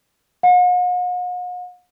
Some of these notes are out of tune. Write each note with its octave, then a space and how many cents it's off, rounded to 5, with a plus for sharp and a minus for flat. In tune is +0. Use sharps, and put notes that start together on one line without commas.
F#5 -45